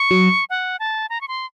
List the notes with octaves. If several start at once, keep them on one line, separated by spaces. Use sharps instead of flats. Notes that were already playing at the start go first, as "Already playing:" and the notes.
Already playing: C#6
F#3
F#5
A5
A#5
C#6
C6